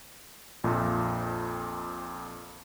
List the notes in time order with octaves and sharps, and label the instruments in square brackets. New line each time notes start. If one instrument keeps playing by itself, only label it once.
[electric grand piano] A#1 F2 A#2